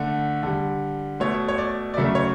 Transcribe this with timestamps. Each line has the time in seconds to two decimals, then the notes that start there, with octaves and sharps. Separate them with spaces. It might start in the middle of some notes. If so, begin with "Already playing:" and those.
Already playing: D3 A3
0.43 D3 G3
1.20 B2 A3 C#5
1.48 C#5
1.58 D5
1.94 D5
1.97 C#3 F#3 A3 E5
2.15 C#5